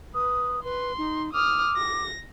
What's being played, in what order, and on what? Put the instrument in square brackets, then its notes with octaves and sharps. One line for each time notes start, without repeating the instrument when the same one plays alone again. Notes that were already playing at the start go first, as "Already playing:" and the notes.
[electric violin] B4 [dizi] D#6
[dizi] B4 [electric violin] C6
[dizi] D#4
[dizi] D6 [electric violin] D#6 F6
[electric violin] A#6